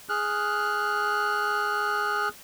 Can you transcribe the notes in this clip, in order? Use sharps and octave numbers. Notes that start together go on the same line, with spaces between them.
G#4 F6 F#6